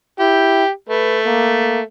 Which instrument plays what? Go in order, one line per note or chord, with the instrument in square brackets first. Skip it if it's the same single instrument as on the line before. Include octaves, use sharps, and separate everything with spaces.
[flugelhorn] E4 [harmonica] G4
[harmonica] A3 [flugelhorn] B4
[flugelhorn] A#3